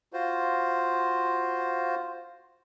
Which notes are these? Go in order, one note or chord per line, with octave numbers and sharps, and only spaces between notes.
F4 F#4 C5